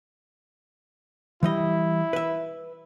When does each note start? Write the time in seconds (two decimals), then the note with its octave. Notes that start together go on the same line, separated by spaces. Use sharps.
1.43 E3 G3 E4 D#5
2.13 B4 E5